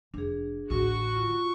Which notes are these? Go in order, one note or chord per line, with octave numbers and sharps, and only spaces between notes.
F1 D4 G#4
A1 D2 F#4 C#6
F4